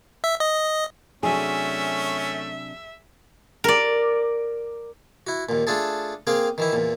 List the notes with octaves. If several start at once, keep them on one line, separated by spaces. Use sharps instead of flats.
E5
D#5
C3 F#3 A3 C#4 D4 G#4 E5
A#4 D5
E4 F#4
D#2 A#2
A3 D4 F4 G#4 A4
A#3 C4 G#4 F5 G5
D#3 E3 E4
E2 A#2